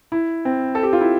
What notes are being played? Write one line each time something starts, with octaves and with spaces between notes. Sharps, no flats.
E4
C4
A4
G4
F4
E4